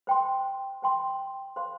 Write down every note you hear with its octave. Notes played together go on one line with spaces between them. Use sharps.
C5 G5 C6
C5 G5 C6
C5 F5 C6